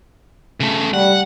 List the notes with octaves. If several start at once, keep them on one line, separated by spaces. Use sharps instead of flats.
C#3 A3
G3 F#5